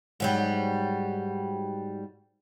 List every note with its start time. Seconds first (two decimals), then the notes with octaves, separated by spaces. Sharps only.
0.20 G#2 F#3 G3